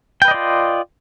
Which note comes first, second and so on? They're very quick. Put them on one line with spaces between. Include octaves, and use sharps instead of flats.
G5 B4 D#5 D5 F4